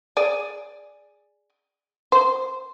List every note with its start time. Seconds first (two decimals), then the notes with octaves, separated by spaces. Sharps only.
0.17 G#4 D5
2.12 C5